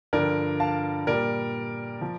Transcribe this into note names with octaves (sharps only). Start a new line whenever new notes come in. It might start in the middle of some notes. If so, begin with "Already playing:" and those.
G2 D3 F3 A#4 D5
F5 A5
A#2 G3 A#4 D5
F3